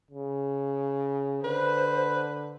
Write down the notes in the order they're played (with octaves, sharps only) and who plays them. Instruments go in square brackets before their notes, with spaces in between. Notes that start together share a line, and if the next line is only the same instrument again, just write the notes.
[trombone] C#3
[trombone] D3 [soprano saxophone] B4 [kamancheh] C5